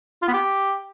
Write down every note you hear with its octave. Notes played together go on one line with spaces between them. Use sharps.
F4
B3
G4